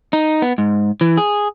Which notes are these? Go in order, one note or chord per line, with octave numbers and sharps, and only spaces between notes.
D#4
B3
G#2
E3
G#4